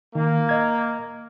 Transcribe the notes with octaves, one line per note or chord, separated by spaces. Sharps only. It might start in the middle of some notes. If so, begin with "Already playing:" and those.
D#3 A#3
D#5 G#6